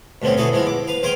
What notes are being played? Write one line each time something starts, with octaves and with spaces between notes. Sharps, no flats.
D2 B2 D3 C4 C#4
B3 E4 F#4 G#4 A4 B4
F3 G#3 B3 E4
D6
B4 F5
E2 C5 F5 G5 G#5